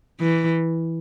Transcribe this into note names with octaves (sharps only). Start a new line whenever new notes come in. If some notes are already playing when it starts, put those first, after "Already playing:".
E3